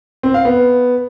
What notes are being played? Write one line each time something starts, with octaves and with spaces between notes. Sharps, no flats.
C4
F5
B3